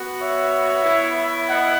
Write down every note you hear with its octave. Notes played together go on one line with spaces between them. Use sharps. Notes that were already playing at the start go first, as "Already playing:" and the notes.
Already playing: B3 F#4
C#5 E5
B3 E4
D#5 F#5